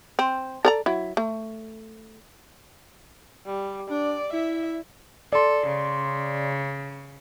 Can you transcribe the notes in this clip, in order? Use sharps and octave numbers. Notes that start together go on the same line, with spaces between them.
C4
A4 D5 A#5
F#3 E4
A3
G3
D4 D5
E4 E5
A4 D5 C6
C#3